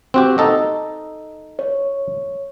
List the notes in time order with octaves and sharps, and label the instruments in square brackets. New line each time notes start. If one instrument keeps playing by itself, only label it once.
[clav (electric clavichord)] C4 F#4 G4
D#4 A4 D#5
[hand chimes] C#5